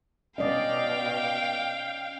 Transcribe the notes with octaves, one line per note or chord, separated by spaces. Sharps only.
B2 C#4 D5 D#5 F5 G5